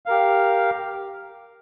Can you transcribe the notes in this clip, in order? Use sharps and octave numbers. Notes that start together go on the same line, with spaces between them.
G4 A#4 F5